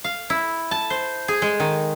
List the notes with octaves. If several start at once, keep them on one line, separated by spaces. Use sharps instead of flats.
F5
E4
A5
C5
G#4
G#3
D#3